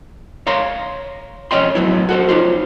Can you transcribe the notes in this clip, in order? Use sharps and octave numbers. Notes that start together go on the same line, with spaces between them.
C#5 F5 A#5 C6
F2 C#4 C#5 D#5 G5 C6
A2 F#3 B3 E4
F#4 A4 C5
D#4 F4 C5